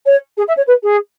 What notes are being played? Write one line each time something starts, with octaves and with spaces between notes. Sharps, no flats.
C#5
G#4
E5
C#5
B4
G#4